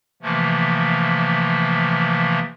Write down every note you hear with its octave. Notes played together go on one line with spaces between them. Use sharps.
C3 E3 F3 A3 A#3